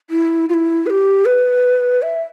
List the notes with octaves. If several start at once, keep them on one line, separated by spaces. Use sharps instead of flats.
E4
F4
E4
B4
G4
B4
E5